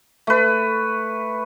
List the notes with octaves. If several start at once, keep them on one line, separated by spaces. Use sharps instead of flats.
A3 B4